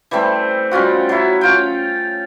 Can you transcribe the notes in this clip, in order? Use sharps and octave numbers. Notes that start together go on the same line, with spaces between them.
E3 G3 A3 C4
G3 C#4 F4 F#4
F#3 E4
C#4 F4 G5